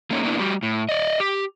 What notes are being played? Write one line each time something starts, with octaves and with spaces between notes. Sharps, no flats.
A3 A#3 C#4 D#4
A#3 B3 D4 E4
G3 F#4 G4
A2
D5 D#5
G4